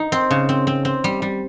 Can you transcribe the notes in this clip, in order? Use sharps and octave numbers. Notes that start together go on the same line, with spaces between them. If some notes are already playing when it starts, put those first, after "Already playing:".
Already playing: D#4
C4
C#3
C4
C4
C4
G3
G3